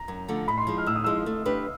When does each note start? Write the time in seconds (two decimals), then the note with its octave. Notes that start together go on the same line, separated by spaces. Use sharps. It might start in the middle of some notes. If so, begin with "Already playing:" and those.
Already playing: A#5
0.08 F#2
0.28 D3 F3 A3
0.48 A2 B5
0.58 C6
0.67 F3 G#3
0.78 F6
0.86 A2 E6
0.96 D#6
1.04 F3 G#3 E6
1.26 A3
1.45 D4 G4 B4